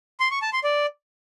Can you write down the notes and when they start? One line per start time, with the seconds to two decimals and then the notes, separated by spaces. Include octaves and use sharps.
0.20 C6
0.31 C#6
0.42 A5
0.53 C6
0.64 D5